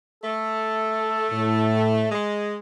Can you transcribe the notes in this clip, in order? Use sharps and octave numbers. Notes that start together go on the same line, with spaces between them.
A3 A4
A2
G#3